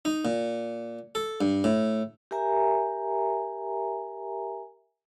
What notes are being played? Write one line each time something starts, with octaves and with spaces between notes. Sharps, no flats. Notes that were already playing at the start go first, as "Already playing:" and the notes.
D#4
A#2
A4
G2
A2
G4 A#4 E5 G#5 A#5